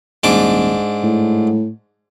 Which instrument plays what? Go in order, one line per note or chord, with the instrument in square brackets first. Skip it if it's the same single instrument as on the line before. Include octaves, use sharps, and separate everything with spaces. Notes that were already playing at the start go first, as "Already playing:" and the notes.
[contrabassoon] D#1 [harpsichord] G#2 D4 D6
[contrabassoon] A2